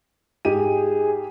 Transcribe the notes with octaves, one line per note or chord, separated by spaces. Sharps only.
G#2 G4 G#4 D#7